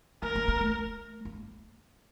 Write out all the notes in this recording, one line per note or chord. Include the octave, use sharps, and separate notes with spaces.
A#3 A#4
A#3
A#3
A3
A#3